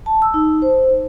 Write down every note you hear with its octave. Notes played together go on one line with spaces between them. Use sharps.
A5
E6
D#4
C5